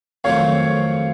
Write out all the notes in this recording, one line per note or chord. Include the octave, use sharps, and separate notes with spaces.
F2 D#3 F#3 A3 C4 C#5 F5